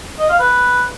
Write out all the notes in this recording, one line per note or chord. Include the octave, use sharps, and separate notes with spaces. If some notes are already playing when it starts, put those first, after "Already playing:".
D#5
F5
B4